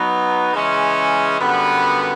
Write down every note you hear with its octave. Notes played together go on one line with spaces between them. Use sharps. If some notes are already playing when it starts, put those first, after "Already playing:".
Already playing: F#3 B3 D#4
C#3 E3 G#3 C#4
F#2 D3 G3 B3